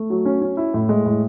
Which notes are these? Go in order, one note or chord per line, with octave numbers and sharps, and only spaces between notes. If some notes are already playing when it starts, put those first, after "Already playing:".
Already playing: A3
F#3
C#4
C#4
E4
A2
G#3
A2